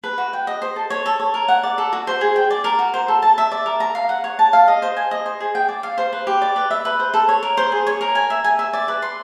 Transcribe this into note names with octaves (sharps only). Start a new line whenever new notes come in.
B4
F#4
G5
D#5
C5
A4
C#5
A4
C#5
A#4
F#5
D5
A4
F#4
C5
G#4
G5
D5
A#4
F#4
C5
A4
A5
E5
D5
A#4
A#5
F5
F#5
C#5
A5
F5
D#5
C5
G#5
D#5
C5
G#4
G5
D5
F5
C5
B4
G4
D5
B4
E5
B4
C5
A4
C#5
A#4
C5
G#4
C#5
A#4
G#5
E5
G#5
E5
D5
B4
C6